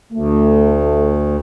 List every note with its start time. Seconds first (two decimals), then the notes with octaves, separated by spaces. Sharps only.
0.12 D2 A3